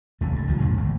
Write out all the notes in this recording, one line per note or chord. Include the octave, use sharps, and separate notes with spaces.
F1 D#2 C3 A3
C#2 G2
F#1 C#2 D#3 F3
F2 A#2 D3 G#3
G#1 D2